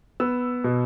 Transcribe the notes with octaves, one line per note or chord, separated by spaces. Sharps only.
B3 E6
B2